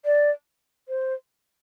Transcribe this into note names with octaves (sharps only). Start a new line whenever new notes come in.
D5
C5